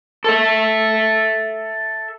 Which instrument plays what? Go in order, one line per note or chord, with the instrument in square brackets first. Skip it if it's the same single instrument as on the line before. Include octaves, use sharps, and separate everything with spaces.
[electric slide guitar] A4 E5